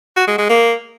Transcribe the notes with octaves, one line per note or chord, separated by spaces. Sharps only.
F#4
G#3
G#3
A#3